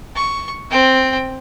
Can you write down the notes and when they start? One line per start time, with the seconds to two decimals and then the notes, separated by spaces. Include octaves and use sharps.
0.16 C#6
0.71 C4 G5